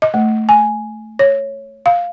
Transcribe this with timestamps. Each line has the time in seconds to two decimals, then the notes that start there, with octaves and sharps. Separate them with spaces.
0.02 D#5
0.14 A3
0.49 G#5
1.19 C#5
1.86 F5